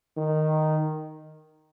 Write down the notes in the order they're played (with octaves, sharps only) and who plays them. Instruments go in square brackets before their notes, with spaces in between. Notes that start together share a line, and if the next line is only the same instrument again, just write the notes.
[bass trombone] D#3